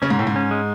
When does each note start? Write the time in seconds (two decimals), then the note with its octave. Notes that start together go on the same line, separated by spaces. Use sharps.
0.02 C#3 C#4
0.10 G#2
0.19 A2 C#3
0.27 G#2
0.36 C#4
0.51 G#3